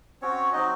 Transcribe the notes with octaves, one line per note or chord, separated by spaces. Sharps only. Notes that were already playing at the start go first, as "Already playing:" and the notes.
C4 C#4 F#4 C#5
F#3 C4 D#4 F#4 D#5